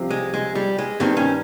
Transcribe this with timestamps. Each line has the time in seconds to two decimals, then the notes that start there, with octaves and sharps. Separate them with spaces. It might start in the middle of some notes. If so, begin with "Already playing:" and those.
Already playing: C2 C3 F3
0.11 G#3
0.34 G#3
0.55 G3
0.78 G#3
1.00 G2 D#3 C4
1.17 C#4